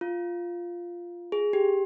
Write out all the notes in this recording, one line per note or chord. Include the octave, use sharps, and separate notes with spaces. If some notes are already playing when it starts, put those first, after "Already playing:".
F4
G#4
G4